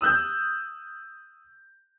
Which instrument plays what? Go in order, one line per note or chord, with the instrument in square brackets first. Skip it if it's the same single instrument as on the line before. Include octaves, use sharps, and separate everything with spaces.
[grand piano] D#6 E6 F#6 G6